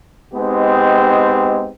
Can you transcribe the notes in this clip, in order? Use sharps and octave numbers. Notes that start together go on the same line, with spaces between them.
G#3 B3 C4 D#4 G4